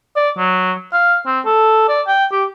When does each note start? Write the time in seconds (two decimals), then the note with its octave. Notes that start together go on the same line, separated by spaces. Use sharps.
0.16 D5
0.37 F#3
0.93 F5
1.26 C4
1.45 A4
1.88 D5
2.07 G5
2.32 G4